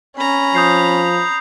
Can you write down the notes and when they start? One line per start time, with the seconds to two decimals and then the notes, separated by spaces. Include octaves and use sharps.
0.17 C#4 A#5 B5
0.55 F3 D#6 G6 C7